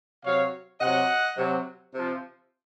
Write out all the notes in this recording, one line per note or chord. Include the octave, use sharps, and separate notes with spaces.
C3 F#3 C#5 F5
C3 F#3 D#5 F#5
C3 F#3
C3 F3